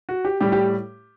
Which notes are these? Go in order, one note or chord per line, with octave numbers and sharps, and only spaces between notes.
F#4
G4
A2 G3 G4
G4